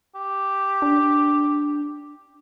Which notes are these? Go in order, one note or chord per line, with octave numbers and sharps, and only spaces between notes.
G4
D4